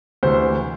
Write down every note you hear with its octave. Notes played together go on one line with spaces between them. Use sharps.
D2 C3 E3 C5